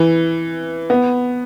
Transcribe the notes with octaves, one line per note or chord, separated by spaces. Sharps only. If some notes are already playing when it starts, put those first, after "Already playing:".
Already playing: E3
B3